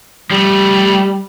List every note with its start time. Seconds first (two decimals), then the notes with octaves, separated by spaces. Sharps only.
0.31 F3 G3 A3